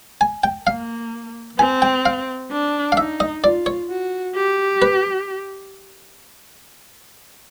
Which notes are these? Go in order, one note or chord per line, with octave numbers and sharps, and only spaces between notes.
G#5
G5
A#3 F5
C4 G#5
G5
F5
D4
F5
D#4 E5
D#5
F4 D5
C#5
F#4
G4
B4